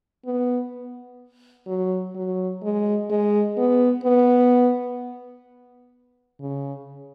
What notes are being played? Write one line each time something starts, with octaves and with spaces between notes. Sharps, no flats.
B3
F#3
F#3
G#3
G#3
B3
B3
C#3